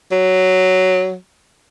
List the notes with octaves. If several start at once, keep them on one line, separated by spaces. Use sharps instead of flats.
F#3